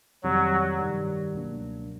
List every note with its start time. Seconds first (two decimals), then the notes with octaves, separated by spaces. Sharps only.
0.23 F2 C3 D#3 F#3 G3
0.79 G2 D#3 G3
1.33 C#2 B2 F#3 A#3 D4